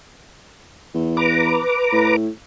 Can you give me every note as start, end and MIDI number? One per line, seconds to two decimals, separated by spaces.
0.95 1.60 40
1.17 2.16 71
1.17 2.16 82
1.17 2.16 86
1.93 2.28 45